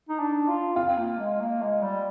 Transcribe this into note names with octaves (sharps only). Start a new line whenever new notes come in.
D#4
D4
F4
C4 F4
C4
A#3
G#3
A#3
G#3
G3